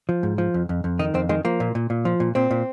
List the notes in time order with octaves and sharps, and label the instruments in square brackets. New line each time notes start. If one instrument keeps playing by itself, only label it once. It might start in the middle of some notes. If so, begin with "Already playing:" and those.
[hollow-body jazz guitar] F3
G#2
F3
F2
F2
F2
D#3 D#4
F2 C4
D#3 G#3
F3 A#3
A#2
A#2
A#2
F3
A#2
A#2 C4
A#2